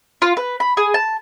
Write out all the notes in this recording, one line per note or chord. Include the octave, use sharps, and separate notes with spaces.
F4
B4
B5
G#4
A5